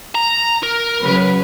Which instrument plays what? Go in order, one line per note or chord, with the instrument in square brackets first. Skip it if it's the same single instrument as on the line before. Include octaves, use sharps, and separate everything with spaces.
[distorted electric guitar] A#5
A#4
[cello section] C#3 F#3 B4